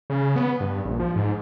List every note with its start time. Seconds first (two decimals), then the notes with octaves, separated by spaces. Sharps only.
0.10 C#3
0.36 B3
0.60 G2
0.85 A#1
1.00 F3
1.16 G#2